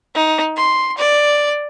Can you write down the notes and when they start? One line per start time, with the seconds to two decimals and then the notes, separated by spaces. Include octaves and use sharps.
0.15 D#4
0.56 C6
0.97 D5